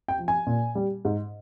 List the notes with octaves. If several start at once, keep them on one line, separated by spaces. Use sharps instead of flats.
G5
F3
G#5
A#2
G3
G#2